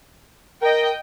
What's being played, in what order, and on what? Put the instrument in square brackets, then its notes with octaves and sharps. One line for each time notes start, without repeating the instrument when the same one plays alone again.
[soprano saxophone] A#4 [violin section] D#5 G5